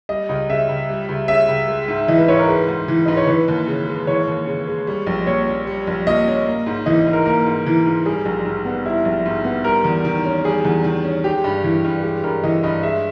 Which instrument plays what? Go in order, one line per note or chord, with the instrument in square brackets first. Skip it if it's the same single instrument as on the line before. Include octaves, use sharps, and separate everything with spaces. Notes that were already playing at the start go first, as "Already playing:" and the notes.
[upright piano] G3 [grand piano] D#5
[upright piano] C#2 [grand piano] D#5
[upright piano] C#3 [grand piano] E5
[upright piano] C#2
G3
C#2
[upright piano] C#3 [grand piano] E5
[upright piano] C#2
G#3
G#2
[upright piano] E3 [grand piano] D#5
[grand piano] B4
[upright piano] G#2 [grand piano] C#5
[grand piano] A#4
[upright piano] G#3 [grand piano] B4
[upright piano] G#2
E3
[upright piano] G#2 [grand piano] D#5
[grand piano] C#5
[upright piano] E3 [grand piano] B4
[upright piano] D#2
C#3
G#3
[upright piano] E3 [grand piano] C#5
[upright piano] D#2
C#3
G#3
G3
A#1
[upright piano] A#2 [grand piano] C#5
[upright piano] C#4
G3
A#1
[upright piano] A#2 [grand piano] D#5
[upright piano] C#4
A#3
G#2
[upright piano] E3 [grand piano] D#5
[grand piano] D#5
[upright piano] G#2
[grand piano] A#4
[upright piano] A#3 [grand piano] A#4
[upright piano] G#2
E3
G#2
[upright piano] G3 [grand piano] G#4
[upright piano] A#1
G#2
B3
[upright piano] G3 [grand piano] E4
[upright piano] A#1
G#2
B3
[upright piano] G3 [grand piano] A#4
[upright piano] E2
D#3
C#4
[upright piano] G3 [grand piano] G#4
[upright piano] E2
D#3
C#4
[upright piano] G#3 [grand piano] G4
[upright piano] G2
E3
G2
[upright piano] G#3 [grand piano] G4
[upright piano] G2 [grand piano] A#4
[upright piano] E3 [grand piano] D#5
[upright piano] G2 [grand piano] D#5
[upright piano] G#3 [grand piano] E5